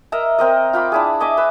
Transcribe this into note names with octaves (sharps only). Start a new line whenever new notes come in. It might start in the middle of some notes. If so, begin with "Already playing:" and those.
A#4 D#5 E5 A#5
C4 A#4 D#5
F4 G5 B5 D6
D4 E4 G#4
D#5 E5 G#5 D6
B4 E6